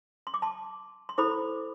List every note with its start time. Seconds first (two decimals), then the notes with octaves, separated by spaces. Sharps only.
0.27 C6
0.34 D6
0.42 A5 C6
1.09 C6
1.18 E4 A4 C5 B5 D6